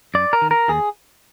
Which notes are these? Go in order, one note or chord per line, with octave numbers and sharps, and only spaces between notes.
F#2 D5
A#4
D#3
A#4
D#2 G#4